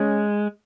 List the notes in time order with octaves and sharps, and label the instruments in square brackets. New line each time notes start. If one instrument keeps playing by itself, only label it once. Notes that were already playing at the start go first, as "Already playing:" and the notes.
Already playing: [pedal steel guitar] G#3 [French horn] C#4